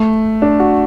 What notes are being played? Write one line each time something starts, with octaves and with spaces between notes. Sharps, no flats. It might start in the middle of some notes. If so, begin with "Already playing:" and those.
Already playing: A3
D4
F#4